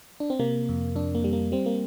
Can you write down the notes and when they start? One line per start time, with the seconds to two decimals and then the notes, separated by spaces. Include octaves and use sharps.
0.20 D4
0.30 C4
0.39 C3 A#3
0.69 F2
0.96 F2 D4
1.15 A#3
1.24 G3
1.33 A#3
1.52 G3 C4
1.66 A#3